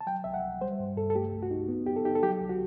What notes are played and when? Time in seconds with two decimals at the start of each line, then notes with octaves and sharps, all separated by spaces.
0.01 A5
0.07 F#3 G5
0.24 C2 E5
0.34 F#5
0.43 C2
0.61 G3 C5
0.79 G2
0.96 G2 A4
1.10 A4
1.15 A3 G4
1.32 C2
1.43 F#4
1.51 D#4
1.69 B3
1.87 F#2 G4
1.96 A4
2.05 D#4 G4
2.15 A4
2.23 F#3 G4
2.41 C2
2.49 F#4